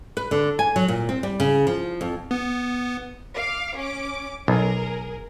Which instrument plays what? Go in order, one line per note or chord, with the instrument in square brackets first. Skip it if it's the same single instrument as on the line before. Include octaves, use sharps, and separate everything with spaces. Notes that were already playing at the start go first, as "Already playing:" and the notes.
[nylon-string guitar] B4
D3
G#5
F#3
A#2
C4
G3
C#3
F3
F2
[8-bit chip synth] B3
[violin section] F5 D6
C#4 D6
[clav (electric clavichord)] B1 [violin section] G#4 A#4